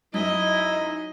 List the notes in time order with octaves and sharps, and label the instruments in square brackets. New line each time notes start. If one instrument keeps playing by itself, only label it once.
[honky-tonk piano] F#2 [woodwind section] D#4 E4 [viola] D#5